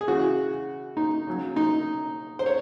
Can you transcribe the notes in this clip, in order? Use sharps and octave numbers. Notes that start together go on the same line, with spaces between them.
G#4
C#3 E3 F#4
D#4
C#3 F#3
D#4
C5
C#5